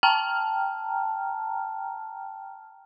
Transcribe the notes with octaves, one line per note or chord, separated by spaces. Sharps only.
G5 A5 A#5 F6